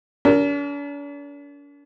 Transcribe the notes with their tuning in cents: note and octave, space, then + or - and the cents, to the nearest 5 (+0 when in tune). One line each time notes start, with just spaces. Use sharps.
D4 -45 A#4 +0